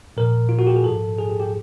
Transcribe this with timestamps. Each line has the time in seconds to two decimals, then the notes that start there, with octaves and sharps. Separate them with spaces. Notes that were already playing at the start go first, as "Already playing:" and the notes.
0.17 A#2 F3 A#4
0.49 F4
0.59 F#4
0.67 G4
0.76 G#4
0.84 G#2 F3 A4
1.18 G#4
1.29 G4
1.40 G4